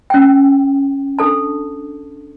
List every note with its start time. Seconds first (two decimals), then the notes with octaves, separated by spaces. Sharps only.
0.10 C#4 G5
1.19 D4 A4 A5